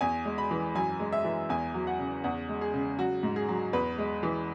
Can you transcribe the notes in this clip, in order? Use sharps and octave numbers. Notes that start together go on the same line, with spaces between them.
E2 G#5
G#3
B5
E3
F#2 G#5
G#3
E5
E3
E2 G#5
F#3
F#5
C#3
E2 F#5
G#3
G#4
C#3
F#3 F#4
G#2
G#4
F#3
E2 B4
G#3
E3